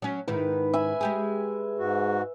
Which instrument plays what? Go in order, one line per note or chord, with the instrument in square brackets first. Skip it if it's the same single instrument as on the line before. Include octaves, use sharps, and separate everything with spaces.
[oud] F#3 C#4
[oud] G#2 D#3 E4 [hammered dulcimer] B4
[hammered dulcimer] E5 G#5 B5
[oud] G#3 G4 G#4
[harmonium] G#2 F#4